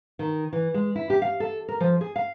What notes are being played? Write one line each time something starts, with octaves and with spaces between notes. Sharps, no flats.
D#3
E3
G#3
E4
G4
F5
A4
A#4
F3
G#4
F5